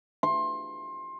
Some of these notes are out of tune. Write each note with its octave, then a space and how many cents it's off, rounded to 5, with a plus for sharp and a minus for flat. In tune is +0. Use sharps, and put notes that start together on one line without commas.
C6 +25